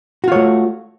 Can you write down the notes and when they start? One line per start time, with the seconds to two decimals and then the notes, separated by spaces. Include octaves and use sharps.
0.24 F#4
0.28 F4
0.32 C#5
0.36 A3